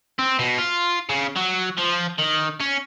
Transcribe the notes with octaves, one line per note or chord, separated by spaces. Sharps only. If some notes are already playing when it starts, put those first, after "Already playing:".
C4
B2
F4
C#3
F#3
F3
D#3
C#4